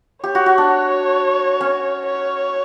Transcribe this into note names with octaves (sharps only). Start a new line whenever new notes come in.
G4 C#5
F#4
F#4
D4
C#4
C#5